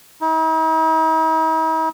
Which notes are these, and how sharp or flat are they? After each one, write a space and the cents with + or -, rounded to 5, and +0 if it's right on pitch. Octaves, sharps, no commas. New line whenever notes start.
D#4 +45